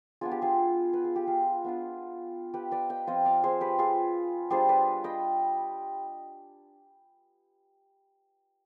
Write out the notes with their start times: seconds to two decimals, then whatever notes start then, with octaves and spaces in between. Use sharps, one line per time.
0.21 B3 D4 F4 G#4
0.32 G4
0.42 F4 G#4
0.93 B4
1.04 G#4
1.16 G4
1.27 F4 G#4
1.64 B3 D4 F4
2.54 G4 B4
2.71 B4 D5
2.89 D#5 G5
3.07 F3 C4 F4 C5 D#5
3.25 D5 F5
3.44 G#4 C5
3.61 G4 B4
3.79 F4 G#4
4.50 G3 D4 F4 G#4 C5
4.69 B4 D5
5.04 D#5 G5